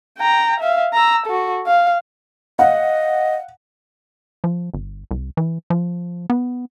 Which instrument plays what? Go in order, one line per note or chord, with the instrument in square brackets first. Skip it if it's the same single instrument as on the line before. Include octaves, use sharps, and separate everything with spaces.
[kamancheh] G5 A#5
E5 F5
A#5 E6
F#4 A4
F5
[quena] D#5 [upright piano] F5 F#5
[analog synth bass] F3
G1
C2
E3
F3
B3